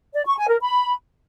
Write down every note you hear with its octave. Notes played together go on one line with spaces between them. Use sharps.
D5
C#6
G#5
A#4
B5